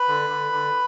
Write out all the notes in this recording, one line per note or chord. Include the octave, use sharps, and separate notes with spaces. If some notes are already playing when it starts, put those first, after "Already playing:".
Already playing: B4 B5
D3
D3
D3